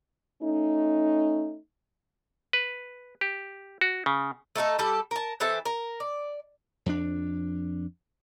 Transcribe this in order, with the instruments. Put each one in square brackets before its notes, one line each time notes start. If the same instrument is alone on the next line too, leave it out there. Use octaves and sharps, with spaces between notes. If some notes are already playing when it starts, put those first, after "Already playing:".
[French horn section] A3 C#4 D#4
[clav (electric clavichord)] B4
G4
F#4
C#3
[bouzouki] A3 D#4 F4 A4
G3 G4 A4
A#4 A5
E3 C4 A4 E5
A#4
D5
[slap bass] F2 D4